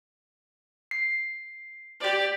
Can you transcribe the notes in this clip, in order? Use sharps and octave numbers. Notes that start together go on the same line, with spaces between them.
C7
G4 D5